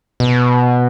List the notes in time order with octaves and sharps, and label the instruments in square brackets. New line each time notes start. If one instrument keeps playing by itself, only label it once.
[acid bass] B2